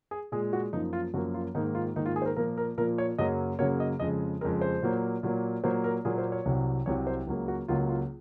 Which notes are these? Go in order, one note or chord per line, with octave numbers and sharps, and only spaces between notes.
G#4
A#2 G#3 G#4
F#4
F#2 F3 A#3 D#4
F4
F#2 F3 A#3 F#4
F4
G#2 D#3 A#3 D#4
F4
G#2 D#3 A#3 D#4
F4
G#4
C5
A#4
A#2 F3 A#3 A#4
A#4
A#2 F3 A#3 A#4
C#5
F#2 C#3 F#3 A#3 D#5
F#2 C#3 F#3 A#3 C#5
D#5
F2 C#3 G#3 D#5
F2 C#3 G#3 A#4
C5
A#2 F#3 A#3
A#2 F#3 A#3
A#2 F#3 A#3 C5
A#4
A#2 F#3 A#3 G#4
C5
C#5
C2 C3 F#3
C2 C3 F#3 C#5
C5
C#2 C#3 F#3 A#3
F#4
C#2 C#3 F#3 A#3 F4
F4